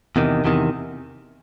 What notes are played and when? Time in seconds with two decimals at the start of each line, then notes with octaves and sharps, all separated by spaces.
0.16 E2 C3 D#3
0.45 E2 C3 D#3